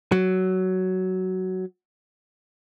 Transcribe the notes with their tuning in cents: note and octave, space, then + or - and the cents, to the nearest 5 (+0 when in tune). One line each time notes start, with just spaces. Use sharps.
F#3 +10